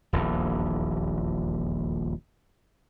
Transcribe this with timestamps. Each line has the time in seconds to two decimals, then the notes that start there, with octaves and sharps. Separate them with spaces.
0.13 D#1 A#1 E2